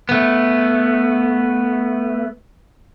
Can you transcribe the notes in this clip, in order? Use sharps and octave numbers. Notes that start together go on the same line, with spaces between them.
A3 B3